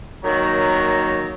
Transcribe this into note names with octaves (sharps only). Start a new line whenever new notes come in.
D#3 F#3 A#3 C#5 A#5